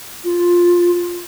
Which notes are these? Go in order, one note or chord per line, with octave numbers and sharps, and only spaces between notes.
F4